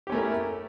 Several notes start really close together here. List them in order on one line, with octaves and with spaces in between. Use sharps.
G4 C#4 A3 A#4 E4